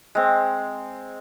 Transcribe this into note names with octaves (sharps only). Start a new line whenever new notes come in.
G#3 C4